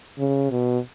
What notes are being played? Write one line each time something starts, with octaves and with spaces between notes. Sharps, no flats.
C#3
B2